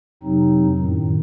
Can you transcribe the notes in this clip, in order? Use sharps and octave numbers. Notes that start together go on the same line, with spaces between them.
F2 C3 F#3 C4 D#4
F#2 A2 D#3